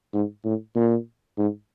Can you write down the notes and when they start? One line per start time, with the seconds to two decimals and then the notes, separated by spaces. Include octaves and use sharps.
0.14 G#2
0.45 A2
0.76 A#2
1.38 G#2